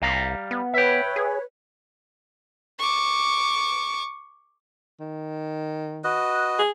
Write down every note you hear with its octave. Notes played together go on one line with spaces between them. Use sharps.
C2 G3 F5 A#5
B3
B4 C#5 E5 G5
G#4
C#6 D6
D#3
F#4 B4 D#5
G#4